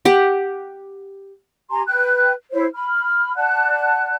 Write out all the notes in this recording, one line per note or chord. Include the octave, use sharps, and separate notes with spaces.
G4 F#5
G4 G#5 A#5 C6
B4 G5 F#6
E4 C5 C#5
B5 F6
D5 F#5 A5 F#6